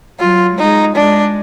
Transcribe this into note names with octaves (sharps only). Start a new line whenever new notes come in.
F#3 F4
G#3 D#4
G#3 D4